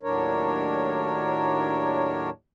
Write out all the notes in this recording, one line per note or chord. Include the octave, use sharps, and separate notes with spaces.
D#2 A2 F#3 D4 A#4 C#5